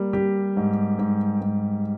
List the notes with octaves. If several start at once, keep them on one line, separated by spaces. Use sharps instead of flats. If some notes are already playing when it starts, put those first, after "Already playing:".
Already playing: G3 A#3
G3 G4
G#2
G#2
G#2